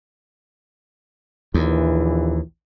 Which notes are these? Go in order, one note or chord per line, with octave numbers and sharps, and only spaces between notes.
A#1 D#2 E3